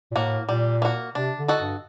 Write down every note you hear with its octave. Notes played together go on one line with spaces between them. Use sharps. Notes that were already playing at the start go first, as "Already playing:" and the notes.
A#2
A2 A#3 F#4
A#2 G3
A#3 F#4
C3 D4
D3
F#4 A4 D#5
G2